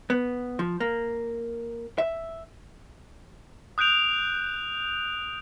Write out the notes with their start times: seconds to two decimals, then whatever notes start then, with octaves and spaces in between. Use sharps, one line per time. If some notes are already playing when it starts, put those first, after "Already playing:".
0.10 B3
0.59 F3
0.80 A#3
1.98 E5
3.78 D#6 F#6 G6 D7 F7